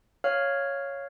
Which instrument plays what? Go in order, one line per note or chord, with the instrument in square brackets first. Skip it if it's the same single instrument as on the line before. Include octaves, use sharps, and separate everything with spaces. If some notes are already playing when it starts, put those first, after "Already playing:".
[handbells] C#5 F5 F6